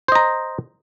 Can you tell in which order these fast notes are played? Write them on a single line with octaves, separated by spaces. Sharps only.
C5 D#5 A#5